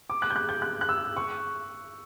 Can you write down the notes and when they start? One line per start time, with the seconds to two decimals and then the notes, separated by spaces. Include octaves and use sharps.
0.10 D6
0.22 F#6
0.30 G6
0.36 F#6
0.49 G6
0.62 F#6
0.81 F#6
0.89 E6
1.17 C#6